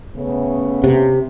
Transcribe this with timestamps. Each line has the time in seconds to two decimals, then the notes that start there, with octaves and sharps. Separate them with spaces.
0.16 C#3 A3 B3
0.84 C3